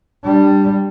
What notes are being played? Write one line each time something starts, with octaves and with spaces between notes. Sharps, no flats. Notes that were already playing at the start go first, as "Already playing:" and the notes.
G3 D4